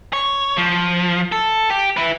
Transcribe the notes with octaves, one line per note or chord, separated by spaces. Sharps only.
C#5
F3
A4
G4
E4 B4